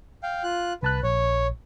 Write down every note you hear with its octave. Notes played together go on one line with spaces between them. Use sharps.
F5 G5
F4 F#6
C2 B4 A5 F#6
A#1 C#5